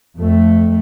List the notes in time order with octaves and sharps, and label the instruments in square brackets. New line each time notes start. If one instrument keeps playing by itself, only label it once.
[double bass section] F2 A3